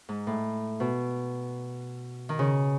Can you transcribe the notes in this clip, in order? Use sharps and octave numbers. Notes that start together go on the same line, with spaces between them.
G#2
A2
B2
D#3
C#3